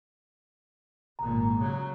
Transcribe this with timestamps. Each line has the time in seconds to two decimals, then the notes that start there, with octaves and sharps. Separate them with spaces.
1.19 G#1 A#2 A#5
1.60 C#3 F#3